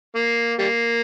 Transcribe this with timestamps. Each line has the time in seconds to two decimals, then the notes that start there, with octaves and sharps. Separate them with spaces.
0.15 A#3
0.58 G3 A#3